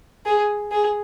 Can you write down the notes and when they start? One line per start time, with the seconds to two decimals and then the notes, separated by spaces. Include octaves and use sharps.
0.26 G#4
0.72 G#4